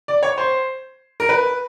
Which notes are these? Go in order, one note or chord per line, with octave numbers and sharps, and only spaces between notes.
D5
C#5
C5
A#4
B4